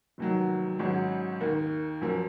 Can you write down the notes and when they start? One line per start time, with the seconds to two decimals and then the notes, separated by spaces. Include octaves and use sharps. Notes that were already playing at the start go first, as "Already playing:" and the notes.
0.18 F1 D#2 D#3 F#3
0.79 G#1 G#2 F#3 C#4
1.41 D#2 D#3 A#3
2.01 F#2 F3 A#3